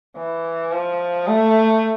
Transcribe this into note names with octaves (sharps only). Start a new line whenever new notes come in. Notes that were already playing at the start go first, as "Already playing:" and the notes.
E3
F3
A3